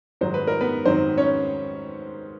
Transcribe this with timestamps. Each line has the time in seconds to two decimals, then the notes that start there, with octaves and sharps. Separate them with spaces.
0.21 G#2 D#3 F#3 C5
0.34 B4
0.47 A#4
0.61 B3 B4
0.85 G#2 D#3 F#3 C4 C5
1.18 C#4 C#5